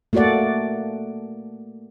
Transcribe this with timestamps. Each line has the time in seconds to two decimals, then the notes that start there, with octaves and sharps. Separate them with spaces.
0.13 A3 A#3 F#4 A4 D5 F#5